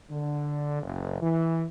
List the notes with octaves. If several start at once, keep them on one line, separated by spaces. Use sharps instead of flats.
D3
F#1
E3